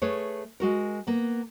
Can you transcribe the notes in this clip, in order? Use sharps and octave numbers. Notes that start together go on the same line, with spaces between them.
A3 G#4 B4 C#5
G#3 F#4 A#4
A#3 B3